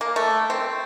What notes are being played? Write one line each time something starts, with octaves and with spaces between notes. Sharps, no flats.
A#3
A3
C4